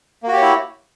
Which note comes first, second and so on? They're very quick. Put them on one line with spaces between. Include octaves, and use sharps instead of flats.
A#3 F#4 G4 C#5 E4